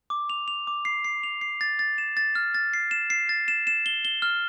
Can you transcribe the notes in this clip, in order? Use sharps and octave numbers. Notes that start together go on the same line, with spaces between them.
D6
F7
F7
D6
C7
C7
F7
C7
A6
A6
E7
A6
F6
A6
C7
E7
C7
A6
E7
E7
G7
G7
F6